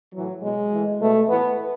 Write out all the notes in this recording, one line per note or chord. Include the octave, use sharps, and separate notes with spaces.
A2 E3 F#3
B2 G#3
A2 E3
B2 A3
A2 E3 B3